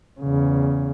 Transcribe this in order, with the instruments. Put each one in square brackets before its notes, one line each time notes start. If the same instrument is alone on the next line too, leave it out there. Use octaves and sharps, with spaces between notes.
[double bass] E2 C#3